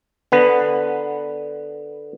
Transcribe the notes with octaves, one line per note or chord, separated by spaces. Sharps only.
D3 B3 B4